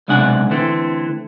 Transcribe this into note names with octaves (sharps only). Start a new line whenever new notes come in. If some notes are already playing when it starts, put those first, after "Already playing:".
B1 C3 G#3 D4 F#5 G#5
D3 E3 A3 C4